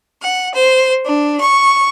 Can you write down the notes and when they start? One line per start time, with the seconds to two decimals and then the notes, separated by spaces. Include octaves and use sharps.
0.21 F#5
0.52 C5
1.05 D4
1.39 C#6